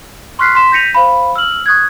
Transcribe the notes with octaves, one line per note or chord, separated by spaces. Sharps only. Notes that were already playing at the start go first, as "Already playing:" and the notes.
C6 C#6 F6 F#6 B6 C7
C6 B6 E7
G6 A#6 B6 C#7 D#7 F7
C5 F5 B5
E6 F6 F#7
C#6 D#6 F#6 G#6